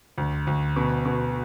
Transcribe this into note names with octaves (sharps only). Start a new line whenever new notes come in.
D2
D2
B2
B2